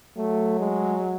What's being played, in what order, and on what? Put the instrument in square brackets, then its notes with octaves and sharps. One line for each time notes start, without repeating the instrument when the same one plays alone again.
[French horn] F#3 [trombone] A3
[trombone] G#3